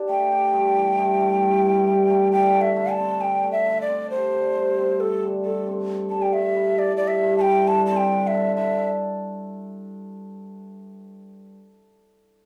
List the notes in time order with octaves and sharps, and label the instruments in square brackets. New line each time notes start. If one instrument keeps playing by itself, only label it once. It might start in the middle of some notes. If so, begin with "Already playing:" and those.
Already playing: [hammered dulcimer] D4 G4
[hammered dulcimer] A3 [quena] G5
[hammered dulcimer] G4
G2
E3
G2
A3
G2
E3
G2
A3
[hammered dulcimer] D3 [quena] G5
[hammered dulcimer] A3
[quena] E5
[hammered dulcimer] D3
[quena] A5
[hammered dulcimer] C4
[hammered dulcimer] D3 [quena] G5
[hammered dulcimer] A3
[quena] E5
[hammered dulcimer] D3
[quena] D5
[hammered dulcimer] C4
[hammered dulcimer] G4 [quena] C5
[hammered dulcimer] D3
G2
C4
[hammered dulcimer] G4 [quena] A4
[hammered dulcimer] D3
[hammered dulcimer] G2 [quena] A4
[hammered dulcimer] C4
A4
[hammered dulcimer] G3 [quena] A5
[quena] G5
[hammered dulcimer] G2 [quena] E5
[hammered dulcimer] E4
[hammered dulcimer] A4 [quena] D5
[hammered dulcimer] G3 [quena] D5
[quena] E5
[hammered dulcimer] G2
[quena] A5
[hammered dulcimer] E4 [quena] G5
[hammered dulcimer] D3 [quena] A5
[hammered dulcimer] C4 [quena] A5
[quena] G5
[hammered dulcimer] D3
[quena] E5
[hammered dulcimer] A4
[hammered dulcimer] D3 [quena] E5